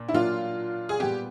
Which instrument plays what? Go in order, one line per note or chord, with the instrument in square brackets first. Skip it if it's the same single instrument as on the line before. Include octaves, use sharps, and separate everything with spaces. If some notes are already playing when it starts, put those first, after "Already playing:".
Already playing: [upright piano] A#2 A#3 D4
[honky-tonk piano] E4
[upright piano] A#2 F#3 A#3 D4 [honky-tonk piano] F4
[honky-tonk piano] G#4
[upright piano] A#2 G3 B3 [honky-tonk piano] G4